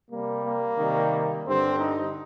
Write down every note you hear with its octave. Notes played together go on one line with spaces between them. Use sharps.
C3 G3 A#3
A#3
C3 D#3 G3
G2 D3 G3 C4
D#4